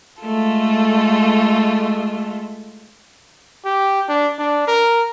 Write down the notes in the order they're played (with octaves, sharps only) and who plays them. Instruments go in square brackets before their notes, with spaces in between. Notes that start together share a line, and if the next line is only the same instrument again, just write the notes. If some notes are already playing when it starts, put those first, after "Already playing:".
[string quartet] G#3 A3 F4 A4
[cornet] G4
D4
D4
A#4